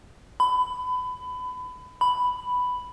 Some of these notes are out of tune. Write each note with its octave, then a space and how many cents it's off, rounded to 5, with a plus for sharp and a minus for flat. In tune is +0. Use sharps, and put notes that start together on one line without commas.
B5 +25
B5 +5